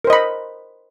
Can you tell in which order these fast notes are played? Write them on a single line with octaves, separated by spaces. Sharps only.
A#4 C5 D#5 B5